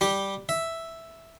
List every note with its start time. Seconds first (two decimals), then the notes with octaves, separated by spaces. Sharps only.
0.01 G3 G4 D6
0.49 E5